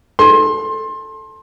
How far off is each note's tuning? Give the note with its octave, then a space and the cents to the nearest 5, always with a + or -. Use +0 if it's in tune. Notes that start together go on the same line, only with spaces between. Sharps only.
A4 +0 C6 +25